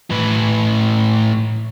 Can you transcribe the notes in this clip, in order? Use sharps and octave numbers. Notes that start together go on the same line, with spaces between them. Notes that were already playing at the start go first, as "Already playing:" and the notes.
A2 B4